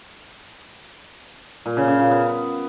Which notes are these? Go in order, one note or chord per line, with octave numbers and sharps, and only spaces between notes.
A#2
C#3
C#3
A#2
B3